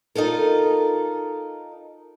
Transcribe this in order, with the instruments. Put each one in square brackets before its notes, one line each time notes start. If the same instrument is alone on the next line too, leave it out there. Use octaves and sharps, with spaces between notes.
[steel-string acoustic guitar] D#4 F4 A4 A#4